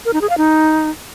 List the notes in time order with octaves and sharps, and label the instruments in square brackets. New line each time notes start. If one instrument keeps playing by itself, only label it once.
[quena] A#4
D#4
G#4
F5
D#4